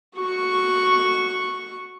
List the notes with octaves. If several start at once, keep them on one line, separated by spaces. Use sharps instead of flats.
F#4 C#6